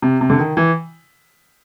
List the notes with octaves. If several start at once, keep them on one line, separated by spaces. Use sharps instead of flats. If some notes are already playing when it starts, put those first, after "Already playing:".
C3
C3
D3
D#3
E3